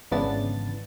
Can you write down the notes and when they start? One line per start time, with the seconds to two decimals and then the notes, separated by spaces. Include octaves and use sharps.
0.11 G#1 C#3 E3 B3 D4 A6